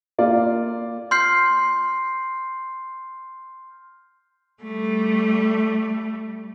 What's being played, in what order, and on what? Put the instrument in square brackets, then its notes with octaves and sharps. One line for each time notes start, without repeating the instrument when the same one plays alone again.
[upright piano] A#3 F4 D5 F5
[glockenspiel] C6 F6 G6 C7
[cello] G3 A3